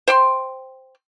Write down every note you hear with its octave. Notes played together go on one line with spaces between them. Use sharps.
C5 G5 C6